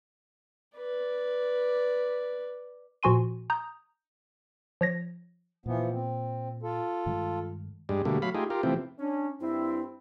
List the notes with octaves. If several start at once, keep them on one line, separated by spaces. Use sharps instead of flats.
B4 D5
A#2 F3 F#4 G#5 C6 D#7
A#5 D#6 G6
F3 C#5 A#6
A#2 E3 F3 B3
C4
F4 A4
G2 D#3 G#3
G2 G3 G#3
B2 D3 G3 A3 A#3
F#3 A3 F5 B5
A3 D#4 F4 G4 G#4
F4 G4 A#4
C3 E3 F3 A3 C4
C#4 D4
G2 C4 E4